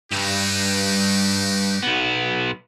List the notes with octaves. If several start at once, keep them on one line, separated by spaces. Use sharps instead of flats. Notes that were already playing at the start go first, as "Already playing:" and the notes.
G2 D#4 F#4 G4
B1 B3